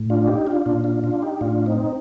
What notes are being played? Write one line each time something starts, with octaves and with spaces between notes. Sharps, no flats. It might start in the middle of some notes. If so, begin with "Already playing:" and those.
Already playing: A2
D4 F4
D#4 G4
D4 F4
A#2 D4 F4
D4 F4
D4 F4
D#4 G4
A2 D4 F4
C4 D#4